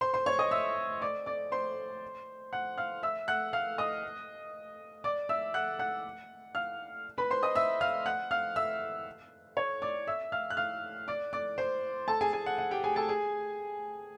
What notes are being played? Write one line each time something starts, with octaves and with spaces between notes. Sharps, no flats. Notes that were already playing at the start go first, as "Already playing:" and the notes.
C5 C6
C5 C6
C#5 C#6
D#5 D#6
E5 E6
D5 D6
D5 D6
C5 C6
F#5 F#6
F5 F6
E5 E6
F#5 F#6
F5 F6
D#5 D#6
D5 D6
E5 E6
F#5 F#6
F#5 F#6
F5 F6
B4 B5
C5 C6
D#5 D#6
E5 E6
F5 F6
F#5 F#6
F5 F6
E5 E6
C#5 C#6
D5 D6
E5 E6
F5 F6
F#6
F5 F6
D5 D6
D5 D6
C5 C6
A4 A5
G#4 G#5
G#4 G#5
F#5
F#5
G4 G5
G#4 G#5
A4 A5
G#4 G#5